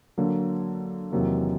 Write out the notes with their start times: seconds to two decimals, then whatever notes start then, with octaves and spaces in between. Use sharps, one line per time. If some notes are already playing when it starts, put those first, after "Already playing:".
0.18 D3 F#3 A#3
1.12 E2 C3 D#3 F#3 A#3